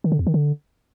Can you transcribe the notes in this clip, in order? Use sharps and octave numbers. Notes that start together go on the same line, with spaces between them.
D#3
D3
E2
D#3
D3